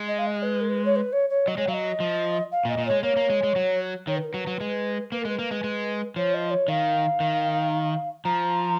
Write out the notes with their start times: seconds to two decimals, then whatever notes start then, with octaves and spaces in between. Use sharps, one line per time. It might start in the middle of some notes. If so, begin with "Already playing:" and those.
Already playing: G#3
0.08 D#5
0.19 F5
0.26 D#5
0.43 B4
0.61 A#4
0.69 B4
0.85 C#5
0.96 B4
1.13 C#5
1.30 C#5
1.48 F#3 D#5
1.58 G#3 C#5
1.68 F#3 F5
1.74 D#5
2.00 F3
2.52 F5
2.65 A#2
2.69 D#5
2.78 A#2
2.87 G#3 C#5
3.03 A#3 C#5
3.17 A#3
3.30 G#3
3.43 G#3
3.56 F#3
4.07 D#3 C#5
4.16 B4
4.24 A#4
4.32 F#3 B4
4.47 F#3
4.61 G#3
5.12 A#3 B4
5.21 A#4
5.25 G#3 B4
5.39 A#3
5.51 G#3
5.64 G#3
6.16 F3 C#5
6.34 D#5
6.51 C#5
6.68 D#3 F5
7.20 D#3
8.25 F3 A#5